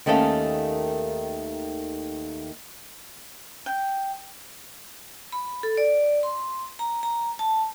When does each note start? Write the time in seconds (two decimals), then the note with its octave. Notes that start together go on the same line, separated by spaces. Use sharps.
0.06 D#2 D#3 A3 C#4 A4 F5
3.66 G5
5.32 B5
5.63 A4
5.77 D5
6.23 C6
6.79 A#5
7.03 A#5
7.39 A5